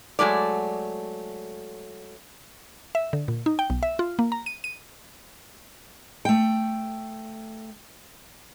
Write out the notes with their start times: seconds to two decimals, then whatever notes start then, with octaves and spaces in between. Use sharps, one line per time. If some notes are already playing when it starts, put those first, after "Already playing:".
0.19 F#3 G#3 A3 D5
2.95 E5
3.13 D3
3.28 A#2
3.46 D#4
3.59 G5
3.70 B1
3.83 E5
3.99 F4
4.19 A#3
4.32 A#5
4.46 D#7
4.64 D#7
6.25 A3 G5